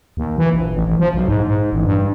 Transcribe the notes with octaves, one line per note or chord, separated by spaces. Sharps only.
D#2
E3
A#1
A1
A1
F3
B1
G#2
G#2
A1
G2